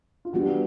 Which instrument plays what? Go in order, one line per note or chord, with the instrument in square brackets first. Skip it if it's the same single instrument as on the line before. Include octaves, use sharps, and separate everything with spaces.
[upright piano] F4
[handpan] E3 G3 B3 D4 G4 [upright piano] F#4